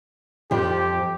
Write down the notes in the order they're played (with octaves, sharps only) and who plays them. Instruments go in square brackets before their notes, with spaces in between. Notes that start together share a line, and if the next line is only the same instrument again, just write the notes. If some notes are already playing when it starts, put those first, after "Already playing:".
[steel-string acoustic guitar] F2 F3 [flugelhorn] G4